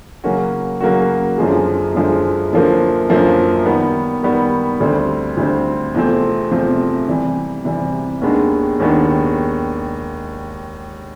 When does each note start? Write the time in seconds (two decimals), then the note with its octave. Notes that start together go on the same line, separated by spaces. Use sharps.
0.24 C#3 F#3 A#3 C#4 F#4
0.81 C#3 F#3 A#3 C#4 F#4
1.38 F#2 D3 F3 G#3
1.95 F#2 D3 F3 G#3
2.53 F#2 D3 F3 A#3
3.09 F#2 D3 F3 A#3
3.66 D#3 G3 B3
4.23 D#3 G3 B3
4.80 D2 D3 G3 C4
5.37 D2 D3 G3 C4
5.94 E2 C3 F3 A3 C4
6.51 E2 C3 F3 A3 C4
7.08 C3 E3 G3
7.65 C3 E3 G3
8.21 D#2 D#3 G#3 B3 D4
8.80 D#2 D#3 G#3 B3 D4